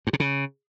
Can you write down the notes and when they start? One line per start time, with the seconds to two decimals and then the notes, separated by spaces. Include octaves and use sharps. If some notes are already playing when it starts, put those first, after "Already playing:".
0.07 G2
0.13 C3
0.20 C#3